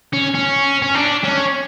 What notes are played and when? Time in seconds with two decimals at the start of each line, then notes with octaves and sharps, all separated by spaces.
0.13 C#4
0.34 C#4
0.82 C#4
0.95 D4
1.24 C#4